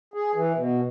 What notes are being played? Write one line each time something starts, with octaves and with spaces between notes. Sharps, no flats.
G#4
E3
B2